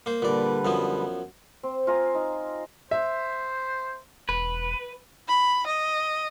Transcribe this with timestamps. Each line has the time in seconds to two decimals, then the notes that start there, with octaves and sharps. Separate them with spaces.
0.06 A#3 C5
0.22 A#2 D3 G3 B4 D5
0.65 F#2 F3 B3
1.63 C4
1.87 F4 G#5 A#5 D#6
2.15 D#4
2.91 C5 E5
4.29 E1 B4
5.28 B5
5.67 D#5